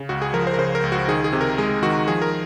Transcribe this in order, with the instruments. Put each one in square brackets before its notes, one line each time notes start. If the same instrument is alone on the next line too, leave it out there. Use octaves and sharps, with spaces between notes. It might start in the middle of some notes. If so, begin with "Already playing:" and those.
Already playing: [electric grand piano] C#3
C#2 F#4
G#4
F3 A#4
C5
A#4
C#3 C5
A#4
C#2
F#4
D#3 G#4
G#4
C3
A#4
G#3 G#4
D#3 F#4
F3 G#4
A#4